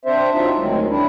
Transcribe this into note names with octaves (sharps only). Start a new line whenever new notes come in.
C4 D4 C5 E5
F#3 D4 D#4 F4 E5
D2 D#3 F#3 G#3 C4
D4 E4